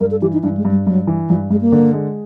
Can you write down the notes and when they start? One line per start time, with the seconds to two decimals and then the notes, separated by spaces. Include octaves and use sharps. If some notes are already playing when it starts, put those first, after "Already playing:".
0.01 G2 A#4
0.11 A4
0.22 E3 G4
0.33 D#4
0.43 G2 D4
0.57 G#3
0.65 G2
0.71 G3
0.87 G2 F#3
1.07 E3
1.29 G2 F3
1.50 G2 G#3
1.61 A#3
1.72 D3
1.93 G#3